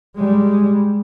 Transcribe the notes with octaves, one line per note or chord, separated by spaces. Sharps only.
G3 G#3